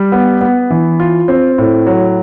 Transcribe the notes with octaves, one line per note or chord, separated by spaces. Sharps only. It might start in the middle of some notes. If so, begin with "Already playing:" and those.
Already playing: G3
B3
B3
E3
F4
C4
A2
F#3